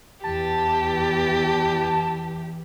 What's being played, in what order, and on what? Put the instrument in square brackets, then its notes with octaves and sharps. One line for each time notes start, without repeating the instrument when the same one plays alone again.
[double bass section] E2 E3 [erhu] G4 [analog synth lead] A5